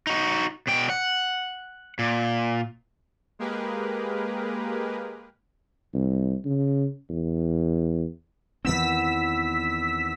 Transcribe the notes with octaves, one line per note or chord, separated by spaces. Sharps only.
D#4 F#4
B2 G5
F#5
A#2
G#3 A#3 G4 G#4 A#4 B4
C2
C#3
E2
E2 D#3 B3 C4 E6 B6